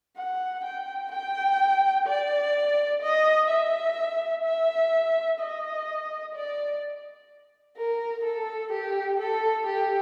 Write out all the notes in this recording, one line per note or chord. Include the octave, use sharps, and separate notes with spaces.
F#5
G5
G5
D5
D#5
E5
E5
D#5
D5
A#4
A4
G4
A4
G4